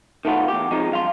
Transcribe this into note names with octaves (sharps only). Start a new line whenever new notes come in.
D#3 A3 B3 F4
E2 G4
C3 F3 G#3 D#4
G2 F5 C6